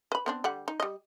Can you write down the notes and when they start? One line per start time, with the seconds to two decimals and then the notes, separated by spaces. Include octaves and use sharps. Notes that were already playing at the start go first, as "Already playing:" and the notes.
0.12 B4 B5
0.26 B3 C4 D4
0.44 D3 G3 F#5
0.68 D#4
0.80 G3 D#5